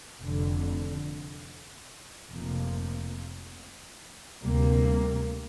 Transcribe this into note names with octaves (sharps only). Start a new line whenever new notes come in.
F1 F2 D3
F1 F2 C3 F3 A#3
D2 C3 G3 A#3